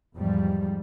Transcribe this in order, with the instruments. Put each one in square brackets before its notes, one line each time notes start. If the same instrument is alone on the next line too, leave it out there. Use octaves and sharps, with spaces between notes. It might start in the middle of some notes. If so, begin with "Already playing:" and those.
[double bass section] E2 G#2 F3 G3